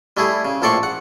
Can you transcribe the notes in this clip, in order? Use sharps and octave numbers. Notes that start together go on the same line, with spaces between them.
G3 A3 E4 G#4
C#3
A#1 A2 A4 D5 C6 C#6
F#5